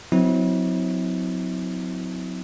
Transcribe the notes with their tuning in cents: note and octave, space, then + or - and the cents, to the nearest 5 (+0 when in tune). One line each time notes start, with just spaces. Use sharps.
F#3 -30 C4 -30 E4 -40